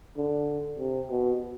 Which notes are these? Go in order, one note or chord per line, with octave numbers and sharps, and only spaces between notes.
D3
C3
B2